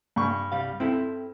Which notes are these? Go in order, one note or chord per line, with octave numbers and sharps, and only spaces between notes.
G2 C#6
C2 G3 F5
C4 E4 A4